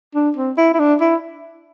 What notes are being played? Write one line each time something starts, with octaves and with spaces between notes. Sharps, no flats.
D4
C4
E4
E4
D4
E4